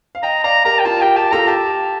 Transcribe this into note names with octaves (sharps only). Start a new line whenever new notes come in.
F5
D#5 G5 A#5
D5 F5 A#5
G4 A#4 A#5
G5
F4 A5
G4 G5
G4 A5
F4 A4 A#5
G4 A5